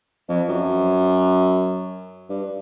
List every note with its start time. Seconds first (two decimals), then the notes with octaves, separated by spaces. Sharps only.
0.29 F2
0.49 F#2
2.29 G2